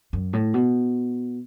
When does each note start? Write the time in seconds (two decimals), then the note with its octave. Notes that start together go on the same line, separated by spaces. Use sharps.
0.13 F#2
0.33 A2
0.54 B2